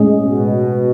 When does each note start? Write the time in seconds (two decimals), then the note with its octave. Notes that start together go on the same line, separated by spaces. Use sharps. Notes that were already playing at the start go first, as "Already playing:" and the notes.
Already playing: A2 G#3 C#4 G#4 D#5
0.25 B2